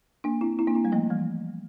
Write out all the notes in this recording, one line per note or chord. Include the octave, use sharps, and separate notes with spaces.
A#3 D4
C4 E4
C4 E4
A#3 D4
C4 E4
G3 A#3
F3 A3
E3 G3